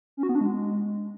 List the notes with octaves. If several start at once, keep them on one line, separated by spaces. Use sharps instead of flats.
C#4
F#4
B3
D4
G#3